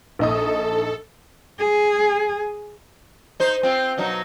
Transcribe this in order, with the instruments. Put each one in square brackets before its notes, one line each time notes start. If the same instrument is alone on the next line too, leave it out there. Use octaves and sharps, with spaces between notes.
[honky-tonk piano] A#1 D#4 D#6 [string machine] A4
[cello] G#4
[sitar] D#4 C5
C4 F4
B2 F#3 D#4